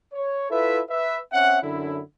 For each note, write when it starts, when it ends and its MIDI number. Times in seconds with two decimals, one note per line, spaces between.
0.13 0.50 73
0.50 0.80 64
0.50 0.80 65
0.50 0.80 69
0.50 0.80 71
0.50 0.80 76
0.90 1.19 71
0.90 1.19 76
1.32 1.58 60
1.32 1.58 61
1.32 1.58 76
1.32 1.58 78
1.62 2.00 42
1.62 2.00 50
1.62 2.00 64